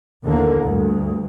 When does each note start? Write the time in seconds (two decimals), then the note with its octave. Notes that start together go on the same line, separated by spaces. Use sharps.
0.24 D#2 D3 E3 A#3
0.62 D2 G2